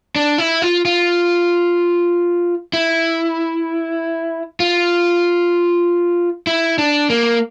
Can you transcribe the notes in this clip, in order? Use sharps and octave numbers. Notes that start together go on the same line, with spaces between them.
D4
E4
F4
F4
E4
F4
E4
D4
A#3